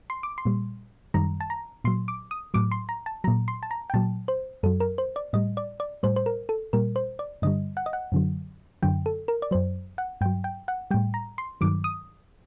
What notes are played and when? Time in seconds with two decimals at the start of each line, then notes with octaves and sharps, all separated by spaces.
0.10 C6
0.23 D6
0.38 C6
0.45 A#2 G3
1.14 F#2 D#3 G3 A#5
1.40 A5
1.50 A#5
1.84 A#2 F#3 C6
2.08 D6
2.31 D#6
2.54 A2 F#3 D6
2.71 C6
2.89 A#5
3.06 A5
3.24 F#3 A#5
3.28 A#2
3.48 C6
3.63 A5
3.71 A#5
3.90 G5
3.94 A#2 F#3 A5
4.28 C5
4.63 F#2 F#3 A4
4.80 A#4
4.98 C5
5.16 D5
5.33 A2 G3 D#5
5.57 D5
5.80 D5
6.03 A2 G3 C5
6.16 C5
6.26 A#4
6.49 A4
6.73 A#2 G3 A#4
6.96 C5
7.19 D5
7.42 G2 D3 G3 D#5
7.77 F#5
7.86 D#5
7.93 F#5
8.12 F#2 D3 F#3
8.82 F#2 D3 F#3 G5
9.06 A4
9.28 A#4
9.42 D5
9.51 F#2 F#3 C5
9.98 F#5
10.21 G2 G5
10.26 F#3
10.44 G5
10.68 F#5
10.91 G3 G5
10.94 A2
11.14 A#5
11.38 C6
11.61 G2 D#3 F#3 D6
11.84 D#6